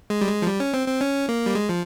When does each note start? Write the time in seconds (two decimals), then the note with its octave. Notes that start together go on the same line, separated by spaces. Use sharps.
0.10 G#3
0.21 G3
0.28 G#3
0.42 F3
0.47 G3
0.60 C#4
0.74 C4
0.88 C4
1.01 C#4
1.29 A#3
1.46 G3
1.55 G#3
1.69 F3